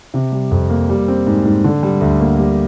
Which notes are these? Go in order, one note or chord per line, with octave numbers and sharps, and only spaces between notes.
C3
G3
F2
A#3
G3
C4
G#2
G#2
D3
G3
D2
A#3
G3